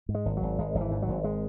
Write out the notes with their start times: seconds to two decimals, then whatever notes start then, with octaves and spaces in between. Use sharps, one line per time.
0.09 G#2
0.15 G#3
0.25 G#1
0.37 F#3
0.42 G#1
0.58 G#1 G#3
0.75 G#1
0.81 E3
0.91 G#2
1.02 F#3
1.08 G#1
1.24 G#3